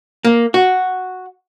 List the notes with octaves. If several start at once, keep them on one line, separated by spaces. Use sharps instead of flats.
A#3
F#4